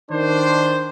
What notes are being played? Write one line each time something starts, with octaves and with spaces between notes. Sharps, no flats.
D#3 D4 C5